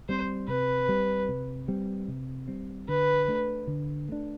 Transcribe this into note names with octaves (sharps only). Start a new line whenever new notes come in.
G3 C4 C5
C3 B4
G3 C4
C3
G3 C4
C3
G3 C4
D3 B4
A3 D4
D3
A3 D4